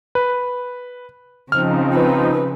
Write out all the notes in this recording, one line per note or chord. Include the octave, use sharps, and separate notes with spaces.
B4
C#3 F3 C4 D#4 F6
B4